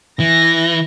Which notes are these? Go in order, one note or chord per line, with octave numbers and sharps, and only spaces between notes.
E3 A#6